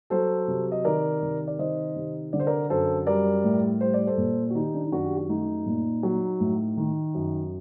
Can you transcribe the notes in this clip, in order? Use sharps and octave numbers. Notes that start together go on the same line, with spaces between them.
F#3 A4 C5
C3
D#5
D#3 A#4 D5
C3
D5
D#3 C5 D#5
C3
D3 D5
C5
A#4 D5
F#2 A4 C5
G3 A#4 D5
A2
G3 C5
D5
A4 C5
A#2
F#4
D#3 D#4 G4
D4
D#4
F#2 D4 F#4
G4
F#4
A3 D#4
A#2
F#3
A2
D#3
F#2